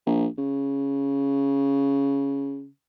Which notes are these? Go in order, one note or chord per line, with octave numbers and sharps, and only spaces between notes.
A#1
C#3